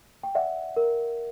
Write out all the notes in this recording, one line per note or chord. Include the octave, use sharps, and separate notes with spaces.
G5
D5 E5 F#5
A#4